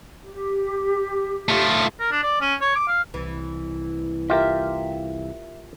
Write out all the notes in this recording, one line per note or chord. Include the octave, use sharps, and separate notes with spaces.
G4
A3 F4
A#4
D4
D5
C#4
C#5
D6
F5
C2 E3
F4 G4 A#4 E5